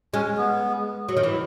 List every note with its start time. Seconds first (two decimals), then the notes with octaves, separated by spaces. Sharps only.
0.14 G#3 C#4
0.38 B3
1.09 F#3
1.17 D#3
1.23 E3